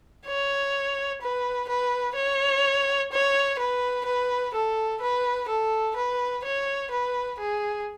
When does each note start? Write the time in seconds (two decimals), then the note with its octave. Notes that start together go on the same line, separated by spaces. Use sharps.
0.26 C#5
1.22 B4
1.69 B4
2.16 C#5
3.12 C#5
3.59 B4
4.06 B4
4.54 A4
5.01 B4
5.48 A4
5.96 B4
6.44 C#5
6.91 B4
7.39 G#4